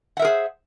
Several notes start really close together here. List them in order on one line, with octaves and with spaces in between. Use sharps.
F#5 E5 A#4 G#4 C5